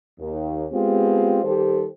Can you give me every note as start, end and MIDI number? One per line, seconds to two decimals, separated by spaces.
0.19 0.65 39
0.72 1.39 56
0.72 1.39 59
0.72 1.39 60
0.72 1.39 65
0.72 1.39 67
1.43 1.86 51
1.43 1.86 55
1.43 1.86 67
1.43 1.86 69
1.43 1.86 72